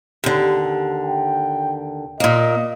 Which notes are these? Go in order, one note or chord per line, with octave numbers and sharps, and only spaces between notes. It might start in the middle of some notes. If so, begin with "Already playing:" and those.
D#2 D3
G5
A#2 A#3 D#5